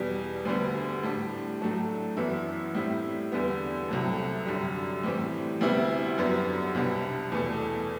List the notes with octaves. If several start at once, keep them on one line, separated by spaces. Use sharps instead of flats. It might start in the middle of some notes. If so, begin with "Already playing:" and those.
Already playing: E2 B2 G3
D2 D3 G3 B3
A2 G3 D4
A2 F#3 A3 D4
F#2 E3 B3 E4
A2 G3 C4 E4
E2 D3 G3 B3
C2 C3 F#3 A3
F#2 D3 G3
A2 E3 G3 C4
D2 C3 G3 B3 E4
F#2 D3 G3 B3
C2 B2 G3 D4
E2 B2 A3